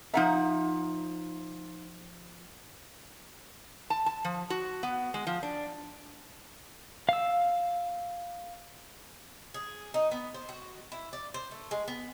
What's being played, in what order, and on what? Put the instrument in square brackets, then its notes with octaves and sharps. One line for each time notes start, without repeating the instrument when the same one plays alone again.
[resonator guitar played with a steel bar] F3 F#5 A#5 [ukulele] D#4 E5
[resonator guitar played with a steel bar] A5
A5
F3
F#4
B3
G#3
F3
D4
[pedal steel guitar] F5 E6
[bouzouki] G#4
D#4
B3
C5
F#4
E4
D5
C5
A3
G#3
B3